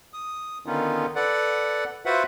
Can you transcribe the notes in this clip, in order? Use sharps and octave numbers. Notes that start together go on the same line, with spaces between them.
D#6
D3 D#3 B3 C#4 D#4 F4
A4 B4 D5 F#5
F4 F#4 B4 C5 E5 F#5